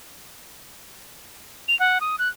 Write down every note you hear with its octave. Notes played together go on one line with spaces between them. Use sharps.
F7
F#5
D#6
F#6